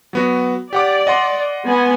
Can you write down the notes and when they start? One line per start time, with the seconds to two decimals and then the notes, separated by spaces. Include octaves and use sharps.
0.13 F#3 B3 F#4
0.73 G4 D5 F#5 D6
1.07 D#5 F#5 C6
1.66 B3 G#5